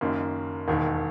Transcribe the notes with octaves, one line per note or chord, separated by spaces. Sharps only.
F#1 F#2 D#3 A#3
E1 D#2 D#3